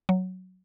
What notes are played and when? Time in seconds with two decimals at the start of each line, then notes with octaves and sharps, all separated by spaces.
0.09 F#3